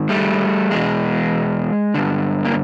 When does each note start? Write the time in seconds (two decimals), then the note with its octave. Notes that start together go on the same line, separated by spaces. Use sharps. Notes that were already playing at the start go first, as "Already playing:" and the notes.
Already playing: G#2 D#3
0.09 G3 A3
0.71 E2 B2 G#3
1.94 G2 D3
2.45 A#3